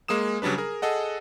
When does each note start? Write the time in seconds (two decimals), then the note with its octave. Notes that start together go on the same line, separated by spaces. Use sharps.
0.08 G#3 A#3 G#4 D#6 E7
0.42 C#3 F#3 G3 D4 B4
0.58 G#4 A#4
0.82 G#4 A4 D#5 F#5